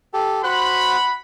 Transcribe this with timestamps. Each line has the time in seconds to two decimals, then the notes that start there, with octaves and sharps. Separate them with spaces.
0.14 G4 A4
0.44 F#4 C5 F#5 B5 F#6